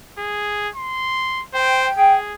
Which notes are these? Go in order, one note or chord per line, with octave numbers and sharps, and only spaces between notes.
G#4
C6
C5 G5
G#4